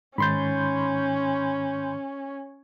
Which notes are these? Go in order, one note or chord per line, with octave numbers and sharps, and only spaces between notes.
G#2 D#3 C#4 B5 C6 G6 A6